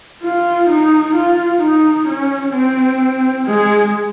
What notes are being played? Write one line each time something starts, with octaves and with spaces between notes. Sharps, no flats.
F4
D#4
F4
D#4
C#4
C4
G#3